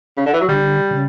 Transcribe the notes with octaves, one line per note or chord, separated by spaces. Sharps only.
C#3
D3
E3
F#3
D3 G3
C#3